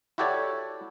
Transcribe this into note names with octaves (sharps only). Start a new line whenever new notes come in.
E4 F#4 G4 A4 C#5 D5